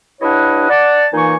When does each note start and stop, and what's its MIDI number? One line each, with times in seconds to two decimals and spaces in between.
0.21 0.67 43
0.21 0.67 62
0.21 0.67 64
0.21 0.67 73
0.21 0.67 75
0.21 0.67 78
0.69 1.06 74
0.69 1.06 78
0.69 1.06 81
1.13 1.35 46
1.13 1.35 52
1.13 1.35 58
1.13 1.35 63
1.13 1.35 80
1.13 1.35 85